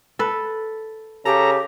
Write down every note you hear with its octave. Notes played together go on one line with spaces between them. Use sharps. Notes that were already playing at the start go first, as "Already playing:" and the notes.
A4 B4
C#3 G4 A4 A#5